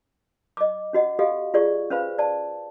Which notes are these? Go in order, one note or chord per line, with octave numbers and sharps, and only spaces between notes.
D#5 D6
C#4 F#4 D#5 F#5
F#4 G4 A4 D#5 F5
F4 G#4 D5 C#6
C#4 B4 C5 F5 B5
D5 A5